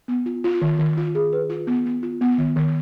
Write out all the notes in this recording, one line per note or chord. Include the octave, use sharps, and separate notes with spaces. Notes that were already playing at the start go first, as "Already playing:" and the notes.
B3
F4
F4
D#3
D#3
F4
G#4
B4
F4
B3
B3
F4
B3
D#3
D#3